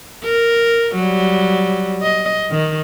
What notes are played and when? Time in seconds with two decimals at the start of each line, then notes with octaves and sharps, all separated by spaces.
0.24 A#4
0.95 F#3 G3
2.02 D#5
2.50 D#3